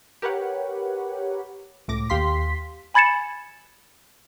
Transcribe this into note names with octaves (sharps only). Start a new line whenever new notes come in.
G4 A#4 B4 C#5 F#5
C#2 A2 D6 A#6
D#2 G4 F5 C6 B6
G#5 B5 G#6 A6 C#7 E7